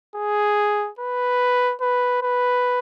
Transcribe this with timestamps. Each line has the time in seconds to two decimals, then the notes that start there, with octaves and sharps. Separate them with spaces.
0.15 G#4
0.99 B4
1.81 B4
2.22 B4